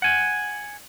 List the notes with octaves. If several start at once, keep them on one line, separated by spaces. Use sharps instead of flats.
F#5 G#5